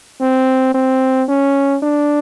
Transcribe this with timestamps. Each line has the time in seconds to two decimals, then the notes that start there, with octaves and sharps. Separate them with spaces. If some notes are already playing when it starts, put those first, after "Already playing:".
0.21 C4
0.74 C4
1.28 C#4
1.82 D4